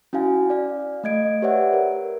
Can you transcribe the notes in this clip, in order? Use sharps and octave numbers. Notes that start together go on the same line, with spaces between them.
C#4 E4 F#4 F5 G#5
D5 F5
A3 D#5 G#6 D7
G4 B4 C#5 D5 E5 F#5
A#4